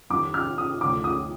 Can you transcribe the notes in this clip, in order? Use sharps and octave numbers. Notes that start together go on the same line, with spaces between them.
F2 D#3 G3 D6
F6
D#6
D2 D3 F3 D6
D#6